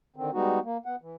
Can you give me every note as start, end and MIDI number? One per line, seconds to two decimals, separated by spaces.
0.16 0.30 50
0.16 0.30 51
0.16 0.30 60
0.33 0.59 55
0.33 0.59 56
0.33 0.59 59
0.33 0.59 63
0.33 0.59 66
0.64 0.77 58
0.86 0.96 59
0.86 0.96 78
1.02 1.16 52